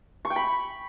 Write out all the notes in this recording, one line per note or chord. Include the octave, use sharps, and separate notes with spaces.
C#6
G5
B5